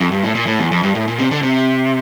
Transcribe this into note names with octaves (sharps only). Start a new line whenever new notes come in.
F2
G2
A2
A#2
A2
E2
F2
G2
A2
A#2
C3
D3
C3